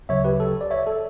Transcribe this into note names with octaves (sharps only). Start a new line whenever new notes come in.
D2 C#3 F#3 C#5 E5
G4 B4
A4
D5
C#5 E5
A4